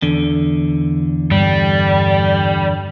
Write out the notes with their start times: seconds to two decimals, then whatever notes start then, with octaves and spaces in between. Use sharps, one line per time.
0.02 E2 D3
1.31 G2 G3